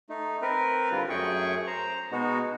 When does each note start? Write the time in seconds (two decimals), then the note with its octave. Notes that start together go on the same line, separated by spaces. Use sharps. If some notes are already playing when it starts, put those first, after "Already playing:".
0.10 A3 D#4
0.42 C4 A#4 B4
0.91 D3 G3 F4
1.09 F#2 A3 G#4 G5 C#6
1.67 C5 A#5
2.12 B2 G#3 B3 D#4 F#4